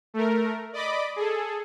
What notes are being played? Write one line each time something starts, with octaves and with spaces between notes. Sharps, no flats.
A3 A#4
D5 D#5 B5 D6
G#4 A4